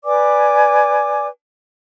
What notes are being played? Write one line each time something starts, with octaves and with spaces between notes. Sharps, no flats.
B4 D5 G#5 D6